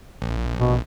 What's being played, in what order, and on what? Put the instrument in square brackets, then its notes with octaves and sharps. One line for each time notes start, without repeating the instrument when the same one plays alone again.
[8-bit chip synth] A#1
[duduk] B2